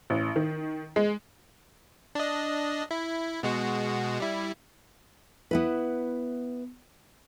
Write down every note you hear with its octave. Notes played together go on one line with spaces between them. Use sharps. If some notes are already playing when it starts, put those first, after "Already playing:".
A1
D#3
G#3
D4 D#5
E4
B2 G#3 F#4
G3 E4
B3 E4 B4